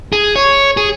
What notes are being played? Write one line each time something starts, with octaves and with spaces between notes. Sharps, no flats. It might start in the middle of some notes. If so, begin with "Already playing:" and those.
G#4
C#5
G#4